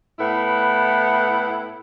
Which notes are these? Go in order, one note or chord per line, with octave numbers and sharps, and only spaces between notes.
A2 B3 E4